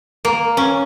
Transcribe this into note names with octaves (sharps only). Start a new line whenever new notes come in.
A#3
C#4